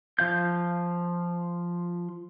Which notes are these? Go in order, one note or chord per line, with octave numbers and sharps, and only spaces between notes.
F3 F5 G6